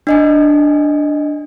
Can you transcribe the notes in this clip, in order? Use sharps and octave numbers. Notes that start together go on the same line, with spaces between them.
D4 D#5 G#5